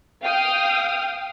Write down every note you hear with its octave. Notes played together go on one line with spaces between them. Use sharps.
F5 G5 D#6 F6